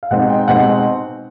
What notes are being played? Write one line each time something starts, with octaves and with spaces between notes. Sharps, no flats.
F5
B2 G#3 C4 D#4 F#5
G5
B2 G#3 C4 D#4 F#5